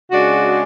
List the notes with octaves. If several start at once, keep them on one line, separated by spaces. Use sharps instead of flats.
C#3 G#3 D4 F#4